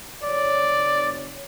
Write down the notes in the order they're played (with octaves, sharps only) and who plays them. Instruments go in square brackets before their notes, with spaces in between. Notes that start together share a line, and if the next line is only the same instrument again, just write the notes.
[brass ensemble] F#1 C#5 [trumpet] D5